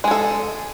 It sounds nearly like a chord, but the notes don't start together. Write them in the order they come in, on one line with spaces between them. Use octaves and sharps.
G#3 G#4 A4